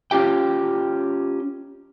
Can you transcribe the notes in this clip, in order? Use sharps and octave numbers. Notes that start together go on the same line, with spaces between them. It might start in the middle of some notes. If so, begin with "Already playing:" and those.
C#4 F4 G4 G5